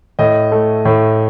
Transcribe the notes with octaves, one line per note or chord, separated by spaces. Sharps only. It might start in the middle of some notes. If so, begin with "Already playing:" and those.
A2 D#5
A3
A2